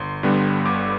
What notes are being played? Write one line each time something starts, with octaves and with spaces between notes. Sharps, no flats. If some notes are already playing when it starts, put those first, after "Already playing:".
Already playing: G1 C6
G2 D3 G3 B3
G1 D6